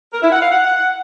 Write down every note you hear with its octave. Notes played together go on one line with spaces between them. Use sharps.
A#4
E4
F#5
F5
F#5